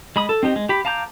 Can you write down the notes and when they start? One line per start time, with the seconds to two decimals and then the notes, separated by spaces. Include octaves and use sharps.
0.16 G#3 B5 D#6
0.29 A4
0.43 C4 D#4 G4
0.56 G#3
0.69 G4 B5
0.85 F5 A5 A#5 D6 G6